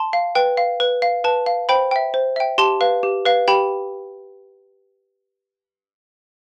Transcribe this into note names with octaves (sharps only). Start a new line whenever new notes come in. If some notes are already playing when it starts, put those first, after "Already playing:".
Already playing: A5 C6
F5
B4 G5
F5
B4
F5
B4 A5
F5
C5 G5 B5
E5 G5
C5
E5 G5
G4 A5 C6
B4 F5
G4
B4 F5
G4 G5 B5